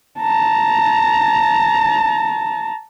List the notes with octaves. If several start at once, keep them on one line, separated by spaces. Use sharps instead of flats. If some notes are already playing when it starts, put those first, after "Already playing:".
A5 A#5